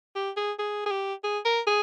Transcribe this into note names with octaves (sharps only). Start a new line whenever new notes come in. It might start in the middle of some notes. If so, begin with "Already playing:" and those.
G4
G#4
G#4
G#4
G4
G#4
A#4
G#4